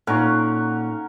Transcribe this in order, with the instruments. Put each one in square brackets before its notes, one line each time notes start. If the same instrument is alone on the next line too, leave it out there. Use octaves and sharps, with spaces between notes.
[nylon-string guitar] A#2 [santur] C#4 A#4 F5 [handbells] D#4 A4 [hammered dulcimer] F#5 C#6